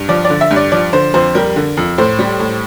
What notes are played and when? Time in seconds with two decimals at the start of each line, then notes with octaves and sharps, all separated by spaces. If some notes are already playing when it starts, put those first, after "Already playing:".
Already playing: G2
0.09 F3 D5
0.25 D5
0.30 D3
0.41 E5
0.51 G2
0.56 D5
0.72 F3 D5
0.93 D3 C5
1.14 F2 C5
1.35 G3 A#4
1.56 D3
1.77 F2
1.98 A2 C5
2.19 G3
2.40 A2